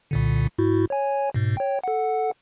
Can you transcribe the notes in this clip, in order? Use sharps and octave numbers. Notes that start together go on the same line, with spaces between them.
C2 A#2 D3
G#2 E4 F#4
C#5 G#5
G#2 B2
C#5 G5
A4 F#5